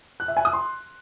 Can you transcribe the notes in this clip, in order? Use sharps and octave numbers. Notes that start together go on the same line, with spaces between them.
F#6
E5
G#5
D#6
C6